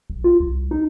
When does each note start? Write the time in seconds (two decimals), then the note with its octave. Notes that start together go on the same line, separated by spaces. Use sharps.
0.10 A#1
0.24 F4
0.40 C2
0.71 D#4